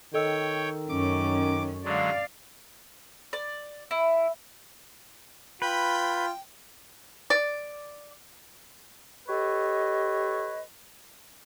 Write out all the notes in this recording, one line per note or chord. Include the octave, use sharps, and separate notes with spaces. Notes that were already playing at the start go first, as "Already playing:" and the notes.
D#3 A4 C#5 D#5 G5 E6
F#2 C#4 D6
D3 F#3 G#3 D5 F5
D5
E4
F4 B4 G5 B5 G6
D5
G4 A4 B4 C#5 D#5